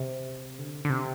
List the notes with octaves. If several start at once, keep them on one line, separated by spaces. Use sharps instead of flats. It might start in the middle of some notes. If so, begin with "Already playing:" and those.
Already playing: C3
D3
D3
C3